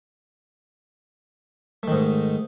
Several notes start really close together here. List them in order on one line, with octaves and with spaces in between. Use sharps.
A3 D#3 G#2